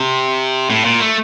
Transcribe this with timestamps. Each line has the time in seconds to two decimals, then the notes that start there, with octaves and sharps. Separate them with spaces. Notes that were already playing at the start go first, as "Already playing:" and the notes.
Already playing: C3
0.70 A2
0.84 A#2
1.00 A3